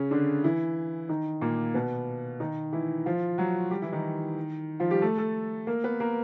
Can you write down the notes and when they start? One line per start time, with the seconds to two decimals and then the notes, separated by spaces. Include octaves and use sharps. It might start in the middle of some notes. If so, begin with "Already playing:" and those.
Already playing: C#3 C#4
0.11 D3 D4
0.44 E3 E4
1.09 D#3 D#4
1.41 A#2 A#3
1.74 B2 B3
2.40 D#3 D#4
2.72 E3 E4
3.06 F3 F4
3.38 F#3 F#4
3.71 G3 G4
3.82 E3 E4
3.92 D#3 D#4
4.80 F3 F4
4.91 G3 G4
5.02 A3 A4
5.18 A3 A4
5.67 A#3 A#4
5.84 B3 B4
6.00 A#3 A#4